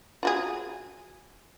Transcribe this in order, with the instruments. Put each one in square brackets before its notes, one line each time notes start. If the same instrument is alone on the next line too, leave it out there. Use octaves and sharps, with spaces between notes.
[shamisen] F4 F#4 G#4